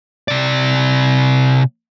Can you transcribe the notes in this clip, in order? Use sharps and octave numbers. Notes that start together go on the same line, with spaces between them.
C3 D5